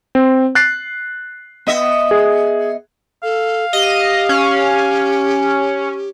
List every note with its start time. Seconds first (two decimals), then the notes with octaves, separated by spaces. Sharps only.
0.15 C4
0.55 F#6 A6 C7
1.67 B3 D#5 E5
2.11 G#4
3.23 A4 F5
3.73 G4 D#5
4.29 C#4